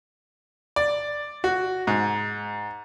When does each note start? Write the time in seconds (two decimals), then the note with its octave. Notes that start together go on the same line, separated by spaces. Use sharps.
0.76 D5
1.44 F#4
1.87 G#2